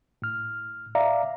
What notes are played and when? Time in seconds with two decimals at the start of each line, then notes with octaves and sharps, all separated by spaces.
0.22 A2 F6
0.95 D5 E5 F5 A#5